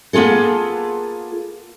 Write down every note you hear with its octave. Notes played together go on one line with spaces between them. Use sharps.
A#3 B3 F4 G#4 A4